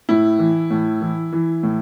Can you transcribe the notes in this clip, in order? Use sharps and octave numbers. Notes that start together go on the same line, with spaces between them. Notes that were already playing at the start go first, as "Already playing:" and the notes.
A2 E4
E3
A2
E3
E3
A2